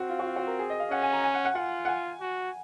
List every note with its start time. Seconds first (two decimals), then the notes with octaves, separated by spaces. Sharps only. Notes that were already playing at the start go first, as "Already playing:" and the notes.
Already playing: C4 F#4
0.10 F4
0.19 F#4
0.27 F4
0.36 F#4
0.47 A#4
0.59 G#4
0.70 D#5
0.80 F5
0.91 C#4 F#5
1.02 G#5
1.13 A#5
1.24 G#5
1.34 F#5
1.45 F#5
1.55 F4 F#5
1.85 F#5
1.88 G#5
2.21 F#4